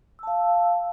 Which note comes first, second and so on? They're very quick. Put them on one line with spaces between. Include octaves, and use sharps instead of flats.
E6 A5 F5